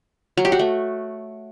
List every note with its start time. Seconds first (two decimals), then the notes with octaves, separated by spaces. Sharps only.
0.37 F#3
0.45 G4
0.52 F#4
0.59 A3